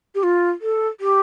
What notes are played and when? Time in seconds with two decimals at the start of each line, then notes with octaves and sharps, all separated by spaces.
0.15 G4
0.23 F4
0.61 A4
1.00 G4